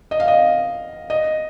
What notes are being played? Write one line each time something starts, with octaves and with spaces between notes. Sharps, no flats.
D#5
F5
D#5
D#5